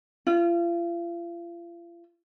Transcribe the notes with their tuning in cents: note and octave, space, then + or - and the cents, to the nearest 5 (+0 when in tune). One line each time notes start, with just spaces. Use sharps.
F4 -40